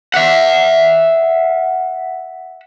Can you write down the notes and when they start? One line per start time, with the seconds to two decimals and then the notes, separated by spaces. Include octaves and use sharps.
0.14 E5 F#5